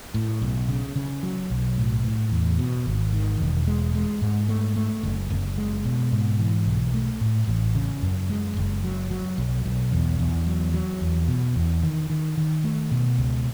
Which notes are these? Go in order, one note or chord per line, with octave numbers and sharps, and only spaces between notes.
A2
B1
C#3
C#3
F#3
B1
A2
A2
E2
B2
G#1
D#3
E1
G#3
G#3
G#2
A3
A3
F#1
F#1
G#3
B2
G#2
E3
B1
A3
A2
A1
C#3
F#2
G#3
F#1
F#3
F#3
B1
B1
E2
E2
F#3
F#3
E2
B2
E2
D#3
D#3
D#3
A3
B2
C#2